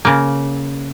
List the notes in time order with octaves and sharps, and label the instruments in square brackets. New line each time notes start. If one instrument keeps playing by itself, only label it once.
[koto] C#3 A#3